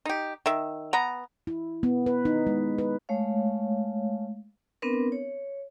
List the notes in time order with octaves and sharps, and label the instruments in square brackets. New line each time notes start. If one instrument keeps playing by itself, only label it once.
[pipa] D#4 G4
D#3 E5
B3 A#5
[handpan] E4
B3
B4
D#4
G#3
B4
[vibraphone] G#3 A3 C#5 F5
B3 C4 D4 A#4 B4
C#5